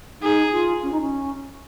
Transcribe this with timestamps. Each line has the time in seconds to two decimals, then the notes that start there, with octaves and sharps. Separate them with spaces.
0.21 D#4 G#4
0.52 F4
0.83 C#4
0.92 D#4
1.01 C#4